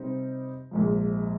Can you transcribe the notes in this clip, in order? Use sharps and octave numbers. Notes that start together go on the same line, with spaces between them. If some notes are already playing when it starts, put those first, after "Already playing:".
Already playing: C3 G3 C4 D#4
A#1 G#2 F3